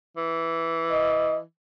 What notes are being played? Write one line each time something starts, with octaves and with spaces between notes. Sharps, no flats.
E3
D#5